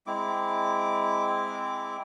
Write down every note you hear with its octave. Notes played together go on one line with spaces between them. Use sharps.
G#3 C4 E4 D6